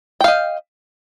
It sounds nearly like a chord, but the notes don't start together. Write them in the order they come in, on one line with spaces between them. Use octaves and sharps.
G5 F5 D#5